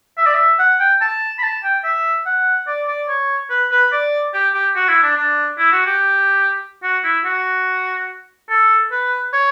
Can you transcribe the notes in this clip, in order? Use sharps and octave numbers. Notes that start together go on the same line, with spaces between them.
E5
D5
E5
F#5
G5
A5
B5
A5
G5
E5
F#5
D5
D5
C#5
B4
B4
D5
G4
G4
F#4
E4
D4
D4
E4
F#4
G4
F#4
E4
F#4
A4
B4
C#5